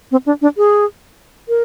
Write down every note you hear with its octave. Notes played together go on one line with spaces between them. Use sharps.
C4
D4
D4
G#4
A#4